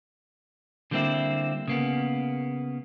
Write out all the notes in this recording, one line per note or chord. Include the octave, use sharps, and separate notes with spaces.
D3 G3 A#3 C4 E4
C#3 A#3 B3